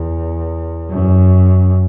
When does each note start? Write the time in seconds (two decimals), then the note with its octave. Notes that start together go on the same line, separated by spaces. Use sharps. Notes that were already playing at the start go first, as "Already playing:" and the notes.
Already playing: E2
0.91 F#2